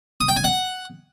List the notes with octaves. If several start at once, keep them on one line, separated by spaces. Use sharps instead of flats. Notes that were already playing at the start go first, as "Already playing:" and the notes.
D#6
G5
G#5
F#5